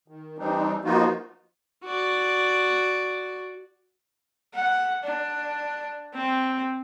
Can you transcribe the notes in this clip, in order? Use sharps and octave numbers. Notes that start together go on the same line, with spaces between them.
D#3
E3 G3 C4 D4 D#4
F3 A#3 B3 D#4 F4 F#4
F#4 D5
F#5
D4
C4